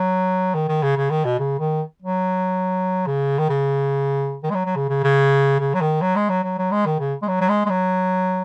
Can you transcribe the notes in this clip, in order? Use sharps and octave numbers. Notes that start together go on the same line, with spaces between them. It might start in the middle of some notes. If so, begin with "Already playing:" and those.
Already playing: F#3
D#3
D#3
C#3
C#3
D#3
B2
C#3
D#3
F#3
C#3
D#3
C#3
D#3
G#3
F#3
F#3
C#3
C#3
C#3
C#3
F#3
D#3
F#3
G#3
F#3
F#3
F#3
G#3
D#3
C#3
G#3
F#3
F#3
G#3
G#3
F#3